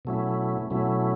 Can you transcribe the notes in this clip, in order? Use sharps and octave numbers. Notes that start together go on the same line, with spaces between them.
B2 F#3 A3 C#4 E4
B2 F#3 A3 C#4 E4